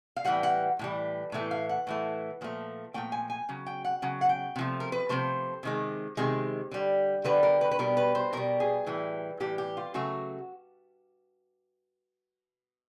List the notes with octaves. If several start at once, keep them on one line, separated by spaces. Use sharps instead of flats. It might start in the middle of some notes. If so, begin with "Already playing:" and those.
F5
A2 E3 G3 F#5
F#5
A2 E3 G3
A2 E3 A3
F5
F#5
A2 E3 A3
A#2 F3 A3
A#2 F3 A3 G5
G#5
G#5
C#3 F#3
G5
F#5
C#3 F#3
F#5
G5
C3 F3 A3
A#4
B4
C3 F3 A3 C5
C3 D#3 G#3
C3 D#3 G#3
D3 G3
D3 G3 B4
A#4
B4
B4
B2 G3 A#4
B4
C5
B2 G3 A#4
G#4
A2 E3 G3
A2 E3 G3 G4
G4
F4
C#3 F#3 A3 F#4